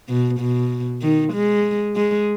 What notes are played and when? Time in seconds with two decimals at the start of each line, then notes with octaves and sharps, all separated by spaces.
0.09 B2
0.40 B2
1.02 D#3
1.33 G#3
1.96 G#3